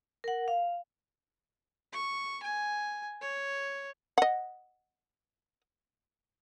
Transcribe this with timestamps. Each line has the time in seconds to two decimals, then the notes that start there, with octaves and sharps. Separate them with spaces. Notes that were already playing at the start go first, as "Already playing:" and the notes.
0.24 A#4 F#5
0.48 F5
1.93 C#6
2.43 G#5
3.21 C#5
4.18 D#5 F#5